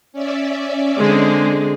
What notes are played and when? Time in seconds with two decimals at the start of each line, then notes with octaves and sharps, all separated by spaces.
0.12 C#4 D5 E5
0.98 D3 G#3 C4 G#4